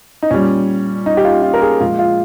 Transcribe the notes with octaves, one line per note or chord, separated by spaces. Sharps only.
D#4
A#2 G3 C#4
D#4
G4
F4
F4
A#4
G#4
A#2 F3 G#3 F4
F4